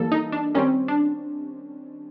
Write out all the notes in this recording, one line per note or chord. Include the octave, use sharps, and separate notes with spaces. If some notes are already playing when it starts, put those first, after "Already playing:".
Already playing: E3 G3 A#3 A4
D#4
D4
D#3 G3 C4 C#4
D4